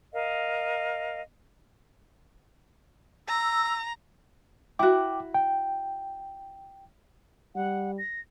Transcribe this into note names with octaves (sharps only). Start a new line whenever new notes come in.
A#4 D#5 F5
A#5 E6
E4 F#4 G5 D6
G5
G3 F#5
A#6